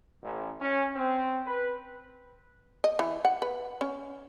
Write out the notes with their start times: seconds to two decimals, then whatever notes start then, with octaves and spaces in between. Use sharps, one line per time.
0.23 A1
0.61 C#4
0.96 C4
1.46 B4
2.84 D#5
2.99 E3
3.25 F#5
3.42 B4
3.81 C#4